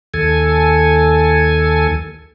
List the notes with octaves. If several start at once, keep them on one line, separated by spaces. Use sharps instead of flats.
D#2 A4 G#5